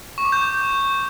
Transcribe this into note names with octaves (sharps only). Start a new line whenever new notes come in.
C#6
D6
G6